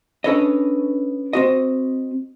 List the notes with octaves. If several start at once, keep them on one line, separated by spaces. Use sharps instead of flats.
C#4 D4 A4 B4 C#5 D#5
C4 F#4 D#5